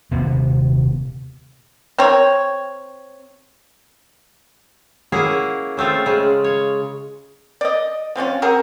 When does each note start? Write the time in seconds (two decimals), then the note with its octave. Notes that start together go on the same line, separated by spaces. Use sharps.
0.11 D#1 C3 B3
1.99 C4 A#4 C#5
5.12 A#3 C#4 E4 G#4 F#5
5.77 C#3 A3 C4 F4
6.06 C#3 G#3
6.44 C#5
7.61 D5 D#5
8.16 F3 C4 C#4 F4
8.42 C4 F#4 G#4 A#4